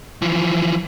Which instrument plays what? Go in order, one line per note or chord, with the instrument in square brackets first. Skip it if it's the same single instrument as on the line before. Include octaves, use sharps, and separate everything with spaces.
[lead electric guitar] E3 F3